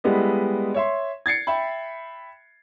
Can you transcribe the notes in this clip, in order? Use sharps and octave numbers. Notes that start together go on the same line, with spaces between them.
G3 G#3 B3 E4 A4 D#5
C#5 E5 C6
G#6 A6 C7 C#7
E5 G5 B5